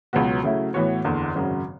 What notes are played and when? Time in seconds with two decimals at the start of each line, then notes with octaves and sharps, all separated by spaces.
0.13 C#2 B2 F#3 B3 F#4
0.44 C#3 F#3 A3 E4
0.74 A2 E3 B3 F#4 C#5
1.05 F#1 E2 D3
1.35 G#1 F#2 C#3 F#3 C#4